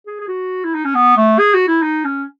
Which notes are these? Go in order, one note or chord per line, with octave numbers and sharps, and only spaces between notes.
G#4
G#4
F#4
E4
D#4
C#4
B3
A3
G#4
F#4
E4
D#4
C#4